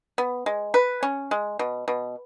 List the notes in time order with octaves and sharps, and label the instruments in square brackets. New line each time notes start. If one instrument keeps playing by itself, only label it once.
[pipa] B3
G#3
B4
C#4
G#3
B2
B2